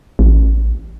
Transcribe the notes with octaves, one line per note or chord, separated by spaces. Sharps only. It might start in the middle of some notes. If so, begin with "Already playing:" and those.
A1